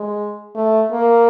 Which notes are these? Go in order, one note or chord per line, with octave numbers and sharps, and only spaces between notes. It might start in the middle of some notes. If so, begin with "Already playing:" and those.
Already playing: G#3
A3
A#3